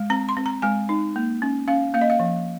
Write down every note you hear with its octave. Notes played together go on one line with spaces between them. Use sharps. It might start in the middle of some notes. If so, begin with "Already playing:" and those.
Already playing: G#3
C4 A#5
C6
C4
A#5
G#3 G#5
D#4
A#3
C#4
C#4 F5
A#3 F5
D#5
F5
F3